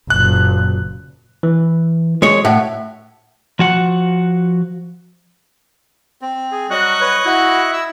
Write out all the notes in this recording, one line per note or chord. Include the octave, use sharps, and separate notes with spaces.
F#1 A#2 F#6
E3
G#3 C#5
A2 E5 F#5
F3 F#4 F#5
C4
G#4
F#3 G3 F#4 D#5 C#6 F#6
B4 C#5
E4 F#4
E6